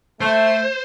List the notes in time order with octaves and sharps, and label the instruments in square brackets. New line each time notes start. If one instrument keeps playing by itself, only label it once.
[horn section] A3 [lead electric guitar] C5